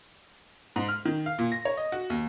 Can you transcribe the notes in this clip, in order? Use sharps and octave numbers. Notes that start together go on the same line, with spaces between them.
G#2
F6
D#3
F5
A#2
A#6
C#5
D#5
F#4
D#2